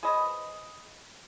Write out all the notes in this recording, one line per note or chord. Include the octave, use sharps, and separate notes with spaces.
G#4 B4 C5 D#5